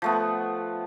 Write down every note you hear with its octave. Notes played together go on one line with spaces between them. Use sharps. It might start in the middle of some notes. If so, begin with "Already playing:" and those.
F3 A3 B3